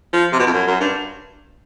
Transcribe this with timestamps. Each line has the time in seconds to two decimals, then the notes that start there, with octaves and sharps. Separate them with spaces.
0.13 F3
0.32 C3
0.39 B2
0.47 F2
0.53 F#2
0.67 F#2
0.80 G2